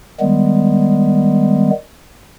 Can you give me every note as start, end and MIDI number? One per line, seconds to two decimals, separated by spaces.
0.21 1.71 51
0.21 1.71 55
0.21 1.71 56
0.21 1.71 59